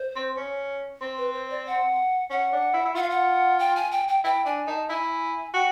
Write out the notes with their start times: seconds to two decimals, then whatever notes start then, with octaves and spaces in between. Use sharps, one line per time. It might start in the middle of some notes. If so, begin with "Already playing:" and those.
Already playing: C5
0.16 C4
0.37 C#4
1.01 C4
1.18 B4
1.33 C5
1.50 D5
1.66 F#5
2.30 C#4 F#5
2.53 D4
2.74 E4
2.85 E4
2.95 F4 F#5
3.02 F5
3.10 F#5
3.59 G5
3.76 G#5
3.91 G5
4.08 G5
4.24 E4 G5
4.45 D4 G#5
4.67 D#4 A5
4.89 E4 G#5
5.54 F#4 G5